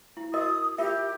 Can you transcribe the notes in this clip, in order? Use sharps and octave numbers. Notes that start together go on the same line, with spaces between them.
E4
F#4 A#4 D#5 D#6
F4 G4 A#4 E5